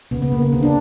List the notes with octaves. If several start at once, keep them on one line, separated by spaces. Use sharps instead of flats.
C#3 B3
B3
C#3 A#3
B3
D3 C4
D4